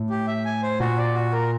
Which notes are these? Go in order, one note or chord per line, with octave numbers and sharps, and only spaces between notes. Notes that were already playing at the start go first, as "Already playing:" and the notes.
Already playing: A2
G4
E5
G#5
C5
A#2 F#4
D5
F#4
A#4